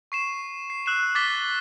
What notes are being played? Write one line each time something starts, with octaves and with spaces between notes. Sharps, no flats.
C#6 C7 E7
C7
E6 F#6 C7 E7
D6 A6 B6 G7